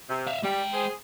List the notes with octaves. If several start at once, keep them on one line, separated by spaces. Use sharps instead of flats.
C3
E5 F5
G3 G#3 G5
G#4 C5